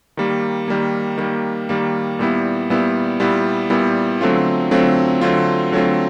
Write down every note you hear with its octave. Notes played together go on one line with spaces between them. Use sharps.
D#3 G3 A#3
D#3 G3 A#3
D#3 G3 A#3
D#3 G3 A#3
A#2 G3 B3 E4
A#2 G3 B3 E4
A#2 G3 B3 E4
A#2 G3 B3 E4
D3 F#3 A3 C4 F4
D3 F#3 A3 C4 F4
D3 F#3 A3 C4 F4
D3 F#3 A3 C4 F4